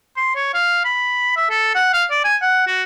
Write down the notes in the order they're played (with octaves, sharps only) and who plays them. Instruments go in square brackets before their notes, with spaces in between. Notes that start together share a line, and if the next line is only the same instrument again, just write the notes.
[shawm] C6
C#5
F5
B5
E5
A4
F#5
F5
D5
G#5
F#5
F#4